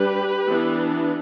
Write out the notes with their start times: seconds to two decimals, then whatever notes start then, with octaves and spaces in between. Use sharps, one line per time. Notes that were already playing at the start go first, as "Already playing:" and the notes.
Already playing: G3 D4 G4 B4
0.48 E3 B3 D4